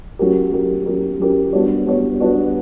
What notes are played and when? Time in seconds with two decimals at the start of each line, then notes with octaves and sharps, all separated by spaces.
0.19 F#3 C#4 G4 A#4
0.52 F#3 C#4 G4 A#4
0.86 F#3 C#4 G4 A#4
1.20 F#3 C#4 G4 A#4
1.53 G3 B3 D4 F#4 C#5
1.86 G3 B3 D4 F#4 C#5
2.20 G3 B3 D4 F#4 C#5